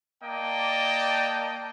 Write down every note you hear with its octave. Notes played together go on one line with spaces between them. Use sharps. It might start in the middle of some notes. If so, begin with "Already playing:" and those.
A#3 D5 D#5 G5 A5